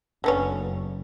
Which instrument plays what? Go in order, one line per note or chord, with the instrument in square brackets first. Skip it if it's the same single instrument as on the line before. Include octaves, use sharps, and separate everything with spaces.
[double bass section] F#1 [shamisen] D3 B3 C#4